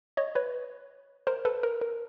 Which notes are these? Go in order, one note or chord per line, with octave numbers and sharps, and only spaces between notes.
C#5 D#5
B4 C#5
A#4 C5
A4 B4
A#4
A#4